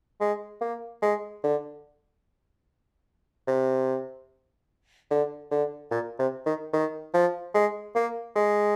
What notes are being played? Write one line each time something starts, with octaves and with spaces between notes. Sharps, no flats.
G#3
A#3
G#3
D3
C3
D3
D3
A#2
C3
D#3
D#3
F3
G#3
A#3
G#3